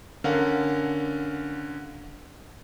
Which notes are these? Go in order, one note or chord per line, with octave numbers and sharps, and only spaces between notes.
D3 C#4 A#4 F5 F#5